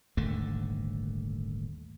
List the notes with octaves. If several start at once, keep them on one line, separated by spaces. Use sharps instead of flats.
D#1 G#1 D3 A3